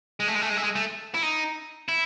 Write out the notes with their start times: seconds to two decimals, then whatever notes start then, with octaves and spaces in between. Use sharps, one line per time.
0.20 G#3
0.28 A3
0.35 G#3
0.41 A3
0.50 G#3
0.57 A3
0.63 G#3
0.75 A3
1.14 E4
1.23 D#4
1.88 E4